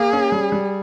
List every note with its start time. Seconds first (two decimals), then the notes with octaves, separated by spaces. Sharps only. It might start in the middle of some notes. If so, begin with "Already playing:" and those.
Already playing: A#3 G#4
0.13 C#4
0.32 G3
0.52 G3